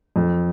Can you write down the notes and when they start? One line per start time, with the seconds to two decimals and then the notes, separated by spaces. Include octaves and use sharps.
0.16 F2